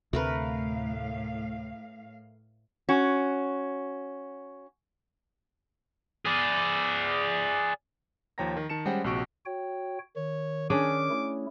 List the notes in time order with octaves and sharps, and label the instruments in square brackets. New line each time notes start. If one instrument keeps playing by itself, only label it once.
[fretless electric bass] D2 C3 [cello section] A2 F5 [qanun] A3 A#4 B4
[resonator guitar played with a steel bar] C#4 F#4
[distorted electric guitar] G#4 D5
[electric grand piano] D#2 F3 C#5 G5 A#5 A#6
D#3
D#3 A5 C#7 E7
G3 G#3 C#4 C5 F#5 G5
A#1 C3 F#4 C#6 D7
[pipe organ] F#4 C#5 G5
[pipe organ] D#3 [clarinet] C#5
[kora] C#4 D4 G#4 [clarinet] D6
[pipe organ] A3 E4